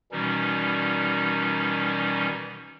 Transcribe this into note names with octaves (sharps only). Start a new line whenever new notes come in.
B2 D#3 E3 G3 C#4 D#4